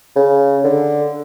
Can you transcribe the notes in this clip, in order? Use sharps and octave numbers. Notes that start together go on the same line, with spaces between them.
C#3
D3